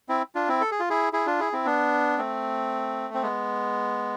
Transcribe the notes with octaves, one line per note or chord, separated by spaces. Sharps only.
C4 E4
D4 F4
C4 E4
A4
G#4
F4
E4 G#4
E4 G#4
D4 F4
E4 G#4
C4 E4
B3 D4
A3 C4
C4
G#3 B3